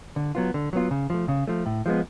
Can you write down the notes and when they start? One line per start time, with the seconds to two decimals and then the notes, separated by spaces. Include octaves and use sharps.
0.16 D3
0.35 F#3 B3 F4
0.54 D3
0.73 F#3 B3 F4
0.91 C#3
1.10 F3 A3
1.28 C#3
1.47 F3 A3
1.66 A2
1.86 F3 G#3 B3